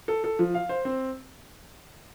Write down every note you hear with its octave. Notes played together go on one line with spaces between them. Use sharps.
A4
A4
F3
F5
C5
C4